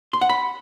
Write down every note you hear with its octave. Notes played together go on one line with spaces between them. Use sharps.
C6
F#5
B5